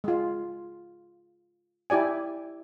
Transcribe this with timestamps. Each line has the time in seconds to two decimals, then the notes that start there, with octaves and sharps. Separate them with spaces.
0.04 G#3 F4
1.90 E4 G4 D5 G#5